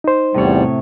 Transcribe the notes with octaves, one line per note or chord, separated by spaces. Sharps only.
D#4 C5
E2 A2 C3 G3 C#5